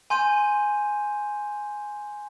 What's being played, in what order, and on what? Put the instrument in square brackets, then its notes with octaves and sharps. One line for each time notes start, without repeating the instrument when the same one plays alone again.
[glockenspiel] G#5 C6 G6 D#7